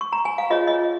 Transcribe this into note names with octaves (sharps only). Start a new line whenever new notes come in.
C#6
A#5
G#5
F5
F4 G#4 C#5 D#5
D#5